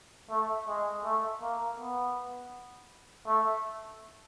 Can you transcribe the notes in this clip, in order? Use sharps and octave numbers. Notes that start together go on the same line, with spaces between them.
A3
G#3
A3
A#3
B3
A3